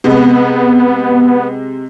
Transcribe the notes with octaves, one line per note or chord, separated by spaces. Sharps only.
C3 G#3 B3